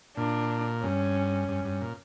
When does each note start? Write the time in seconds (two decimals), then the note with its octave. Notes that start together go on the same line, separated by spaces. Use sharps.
0.17 A#2 D4
0.83 G2 C#4
1.49 G2
1.65 G2
1.81 A#2